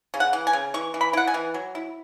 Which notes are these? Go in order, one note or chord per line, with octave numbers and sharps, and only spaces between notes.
C#3
F#5
E3
G#5
C#3
E3 C#6
E3
B5
E4 F#5
G#5
E3
F#3
E4